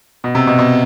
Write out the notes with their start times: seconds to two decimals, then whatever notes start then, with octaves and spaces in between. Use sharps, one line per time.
0.24 B2
0.35 C3
0.47 B2
0.59 B2